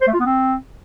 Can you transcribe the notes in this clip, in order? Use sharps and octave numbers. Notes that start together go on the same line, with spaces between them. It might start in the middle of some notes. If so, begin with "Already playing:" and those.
C5
A3
F4
B3
C4